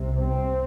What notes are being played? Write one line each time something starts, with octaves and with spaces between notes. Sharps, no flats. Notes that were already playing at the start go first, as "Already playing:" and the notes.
Already playing: C2 C3
C4